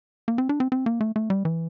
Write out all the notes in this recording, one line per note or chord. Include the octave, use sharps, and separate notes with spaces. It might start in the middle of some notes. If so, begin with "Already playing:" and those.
A#3
C4
D4
C4
C4
A#3
A3
A3
G3
E3